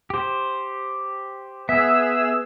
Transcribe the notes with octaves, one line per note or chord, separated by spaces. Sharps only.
G4 C5
B3 G#4 E5 E6